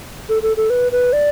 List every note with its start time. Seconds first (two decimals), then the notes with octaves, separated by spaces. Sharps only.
0.29 A4
0.42 A4
0.57 A4
0.70 B4
0.92 B4
1.13 D5